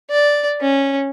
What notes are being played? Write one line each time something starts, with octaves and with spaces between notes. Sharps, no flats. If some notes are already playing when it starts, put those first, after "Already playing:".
D5
C#4